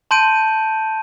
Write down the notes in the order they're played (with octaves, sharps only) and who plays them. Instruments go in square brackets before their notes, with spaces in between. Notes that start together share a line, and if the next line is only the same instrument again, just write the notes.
[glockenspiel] A5 C6 G6 D7 D#7